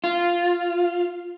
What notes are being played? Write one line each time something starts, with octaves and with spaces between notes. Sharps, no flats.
F4